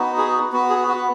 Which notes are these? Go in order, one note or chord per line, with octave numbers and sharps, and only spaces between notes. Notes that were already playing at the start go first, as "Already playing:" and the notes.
Already playing: B3 D#4 F#4
G#4
B3 F#4
G#4
F#4